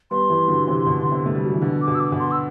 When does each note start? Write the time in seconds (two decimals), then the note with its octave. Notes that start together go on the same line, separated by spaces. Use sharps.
0.11 G3 B3 C6
0.30 E3 G3
0.48 D3 F#3
0.67 C3 E3
0.86 B2 D3
1.01 D3
1.12 C3
1.26 A3
1.35 G3
1.44 F#3
1.54 E3
1.62 B2 D3
1.82 D6
1.87 B2
1.95 E6
2.00 D6
2.12 B2
2.20 C6
2.31 E6